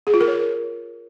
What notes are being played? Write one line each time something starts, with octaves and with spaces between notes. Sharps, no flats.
G#4
F4
A#4
C#5